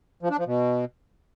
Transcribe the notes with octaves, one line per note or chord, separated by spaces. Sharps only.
F3
D4
F3
B2